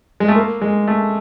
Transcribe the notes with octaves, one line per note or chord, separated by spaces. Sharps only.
G#3
A3
A#3
G#3
A3